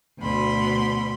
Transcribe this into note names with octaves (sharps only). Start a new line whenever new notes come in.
D2 B2 B5 C6